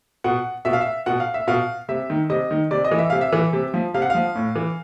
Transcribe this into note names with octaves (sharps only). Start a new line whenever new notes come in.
B2 F#5
B2 E5
F5
E5
B2 F#5
F5
E5
B2 F5
C3 E5
D#3
C3 D#5
D#3
C3 D5
D#5
E3
E5
C3 F5
E5
E3
C3
F3
C3 F5
F#5
F3 F5
A2
E3